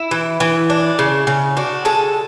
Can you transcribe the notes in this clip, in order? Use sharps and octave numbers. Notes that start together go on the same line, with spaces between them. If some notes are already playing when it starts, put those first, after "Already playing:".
Already playing: E4
E3
E3
D4
C#3
C#3
D4 F#4
G#3 A4